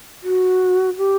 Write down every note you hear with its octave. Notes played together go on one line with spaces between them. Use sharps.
F#4
G4